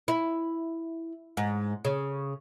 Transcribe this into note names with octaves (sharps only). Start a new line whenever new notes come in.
E4
G#2
C#3